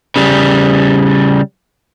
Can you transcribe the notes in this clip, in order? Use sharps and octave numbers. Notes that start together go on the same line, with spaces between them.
C#3 G3